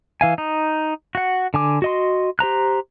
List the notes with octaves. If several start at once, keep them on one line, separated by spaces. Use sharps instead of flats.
E3 F5 G#5
D#4
F#4 F#5
D3 G#5 D6
F#4 D#5 C6
G4 C5 A#5 F#6